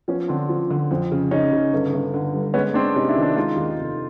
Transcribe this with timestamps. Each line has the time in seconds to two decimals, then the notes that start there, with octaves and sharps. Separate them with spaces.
0.08 F3 B3 C#4
0.28 D3 C4 D4
0.49 F3
0.71 D3
0.91 F2
1.12 C#3
1.31 C#3 C#4 D#4
1.52 C#3
1.73 G1
1.93 G1
2.14 D3
2.34 G2
2.54 G#3 B3 C#4
2.74 G#3 C4 D4
2.95 C3 C#4 D#4
3.09 D4 E4
3.16 D#3
3.23 D4 E4
3.36 G#3 D#4 F4
3.56 D#2
3.78 F1